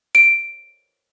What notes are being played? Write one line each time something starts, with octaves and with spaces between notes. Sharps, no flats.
D7